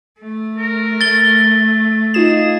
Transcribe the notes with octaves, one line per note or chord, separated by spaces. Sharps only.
A3
A#4
A3 A6 G7
D#4 F4 G#4 E7